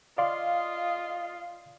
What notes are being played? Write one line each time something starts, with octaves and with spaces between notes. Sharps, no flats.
F4 D5 D#5 F5 C6